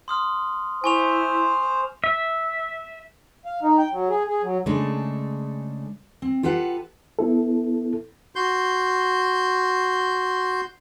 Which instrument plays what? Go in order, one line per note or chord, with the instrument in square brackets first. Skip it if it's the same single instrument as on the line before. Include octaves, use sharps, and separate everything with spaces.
[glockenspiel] C6 D#6 F6
[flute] E4 [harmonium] C5 [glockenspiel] G#5 C#6 F7
[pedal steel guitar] E5
[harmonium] F5
D#4
G5
F#3
G#4
G#4
F#3
[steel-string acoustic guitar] C#3 G#3 A3 D4 A4
C4
F4 G4 A4 B4 F#5
[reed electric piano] B3 E4 A4
[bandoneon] F#4 C6 G6